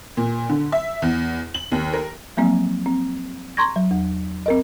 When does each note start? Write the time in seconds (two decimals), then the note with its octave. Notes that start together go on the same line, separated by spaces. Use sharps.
0.17 A#2
0.49 D3
0.72 E5
1.02 E2
1.54 F#7
1.72 D#2
1.94 A#4
2.37 F3 F#3 A#3 C4
2.86 C4
3.57 A#5 C6 C#6 G#6 A#6
3.76 F#3
3.91 E2
4.46 C4 A#4 D#5